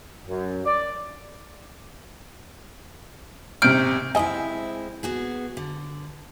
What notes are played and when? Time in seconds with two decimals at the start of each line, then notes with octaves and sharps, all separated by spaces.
0.25 F#2
0.66 D5
3.62 G#1 C3 F6 G6 D7
4.15 F3 G#3 C4 E4 D#5 G#5
5.03 B3 F#4 G#4
5.57 D3